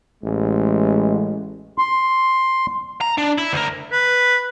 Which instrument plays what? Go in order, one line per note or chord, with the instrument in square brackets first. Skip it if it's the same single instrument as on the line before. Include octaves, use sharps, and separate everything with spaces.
[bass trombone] A1 [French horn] G#3
[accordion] C6
[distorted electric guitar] A#5
D4
E4
D2 A#4
[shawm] B4